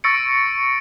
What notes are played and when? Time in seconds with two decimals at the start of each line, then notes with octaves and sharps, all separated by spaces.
0.04 C#6 E6 A6 A#6 C#7 D7